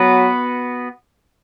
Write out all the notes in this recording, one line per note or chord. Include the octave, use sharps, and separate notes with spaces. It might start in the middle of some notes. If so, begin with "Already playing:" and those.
Already playing: F#3 B3 F#4 B4